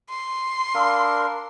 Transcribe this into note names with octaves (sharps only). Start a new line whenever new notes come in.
C6
D4 A#4 F5 B5 E6